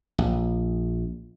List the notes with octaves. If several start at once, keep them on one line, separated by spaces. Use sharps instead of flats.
A#1